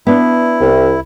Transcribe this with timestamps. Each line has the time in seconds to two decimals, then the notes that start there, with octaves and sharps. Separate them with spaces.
0.07 B3 D4 E4
0.60 C2